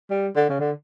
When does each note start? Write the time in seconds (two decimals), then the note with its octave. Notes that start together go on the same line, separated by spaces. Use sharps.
0.10 G3
0.36 D3
0.49 C#3
0.59 D3